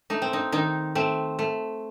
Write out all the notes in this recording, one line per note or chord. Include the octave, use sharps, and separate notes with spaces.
A3 D#4
C4
D#4
D#3 D#4
A3 C4
A3